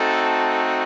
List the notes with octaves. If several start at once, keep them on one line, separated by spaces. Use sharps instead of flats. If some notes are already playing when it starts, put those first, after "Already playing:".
Already playing: A3 C4 D#4 F#4 A4